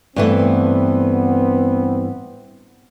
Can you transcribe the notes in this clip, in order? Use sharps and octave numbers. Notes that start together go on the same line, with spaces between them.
G2 E3 A3 B3 C4